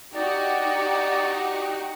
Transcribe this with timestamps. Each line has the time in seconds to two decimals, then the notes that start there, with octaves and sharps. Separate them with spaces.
0.15 D#4 F#4 G4 D5